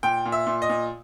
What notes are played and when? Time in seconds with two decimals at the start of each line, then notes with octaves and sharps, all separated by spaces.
0.03 A#2 G5
0.26 A#2
0.32 E5
0.47 A#2
0.62 D#5
0.69 A#2